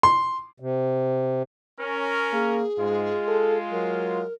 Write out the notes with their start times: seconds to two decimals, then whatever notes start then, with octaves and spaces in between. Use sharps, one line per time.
0.03 C6
0.60 C3
1.79 C#4 A#4
2.33 A#3 G#4
2.78 G#2 G#3 F4
3.28 A4
3.72 F#3 A#4